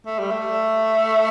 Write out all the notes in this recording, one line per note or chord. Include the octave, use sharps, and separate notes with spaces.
A3
G3
A3